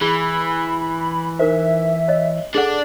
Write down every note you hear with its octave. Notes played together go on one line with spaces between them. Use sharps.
E3 G#4 B5 G7
D#4 A#4 C5 E5
C#5 D#5
D4 G#4 A4 D5 F#5